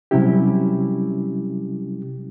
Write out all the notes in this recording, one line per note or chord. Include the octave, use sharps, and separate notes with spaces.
C3 F#3 G3 C#4 E4 G4